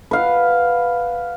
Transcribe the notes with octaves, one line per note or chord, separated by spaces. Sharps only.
B4 F5 F#5